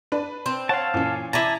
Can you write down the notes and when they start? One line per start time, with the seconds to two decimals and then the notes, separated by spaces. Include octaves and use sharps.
0.12 D4 B4
0.46 C4
0.69 C#5 F5 F#5 A5
0.94 A#2 E3 C#4
1.33 E4 A5 A#5 D6 D#7